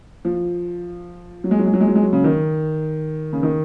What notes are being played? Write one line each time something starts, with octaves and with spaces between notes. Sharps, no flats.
F3
F#3
G#3
F#3
G#3
F#3
G#3
F#3
G#3
F#3
C#3
D#3
C#3
D#3